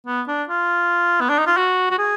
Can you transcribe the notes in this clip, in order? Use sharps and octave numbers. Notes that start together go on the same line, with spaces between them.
B3
D4
F4
B3
D4
D#4
F4
F#4
F#4
G#4